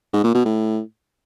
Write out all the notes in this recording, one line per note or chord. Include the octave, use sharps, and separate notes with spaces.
G#2
A#2
B2
A2